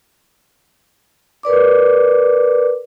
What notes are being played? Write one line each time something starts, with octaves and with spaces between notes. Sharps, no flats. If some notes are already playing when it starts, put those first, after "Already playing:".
A#4 B4 D5 D6